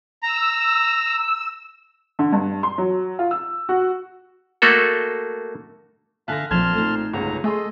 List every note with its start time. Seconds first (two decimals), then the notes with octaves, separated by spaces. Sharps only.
0.23 A#5 E6
2.19 D3
2.32 G2
2.63 C6
2.78 F#3
3.19 F4
3.31 E6
3.69 F#4
4.62 A3 A#3 F#4 A4
6.28 D3 E5 F5 G#5 A5 F#6 A#6
6.51 B1 A#2 F3 C4 A5 C6 F6 G#6
6.74 A3 D#4
7.14 G1 C#2 A#5
7.44 A3 G#4 A4 D#5 C6